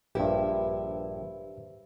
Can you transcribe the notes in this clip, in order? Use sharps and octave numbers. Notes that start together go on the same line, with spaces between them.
A#1 G2 E4 G4 B4 C5